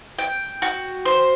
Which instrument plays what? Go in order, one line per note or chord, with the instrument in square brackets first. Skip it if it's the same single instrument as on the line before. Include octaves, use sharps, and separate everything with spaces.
[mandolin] G5
F#4
C5